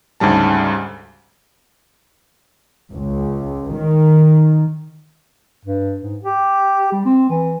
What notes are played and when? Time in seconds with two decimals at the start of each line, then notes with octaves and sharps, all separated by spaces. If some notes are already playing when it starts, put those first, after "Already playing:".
0.20 D2 G#2 C#3 G3 A5
2.93 C#2
3.75 D#3
5.65 G2
6.02 G#2
6.23 G4
6.92 G3
7.05 C4
7.30 E3